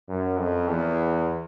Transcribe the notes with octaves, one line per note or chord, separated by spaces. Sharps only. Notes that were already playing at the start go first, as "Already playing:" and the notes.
F#2
F2
E2